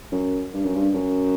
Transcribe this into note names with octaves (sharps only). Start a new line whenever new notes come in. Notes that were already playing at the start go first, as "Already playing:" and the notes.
F#2
G2
F#2
G2
F#2